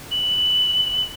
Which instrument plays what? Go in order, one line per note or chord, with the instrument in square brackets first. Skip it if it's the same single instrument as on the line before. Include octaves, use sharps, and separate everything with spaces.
[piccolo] F#7